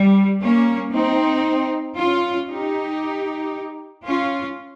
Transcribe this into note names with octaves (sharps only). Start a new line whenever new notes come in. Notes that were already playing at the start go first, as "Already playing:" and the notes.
Already playing: G3
A#3 C#4
C4 D#4
C#4 F4
D#4 G4
C#4 F4